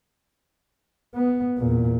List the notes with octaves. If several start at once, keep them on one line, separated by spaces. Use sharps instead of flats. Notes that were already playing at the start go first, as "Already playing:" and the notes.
B3
E2 A#2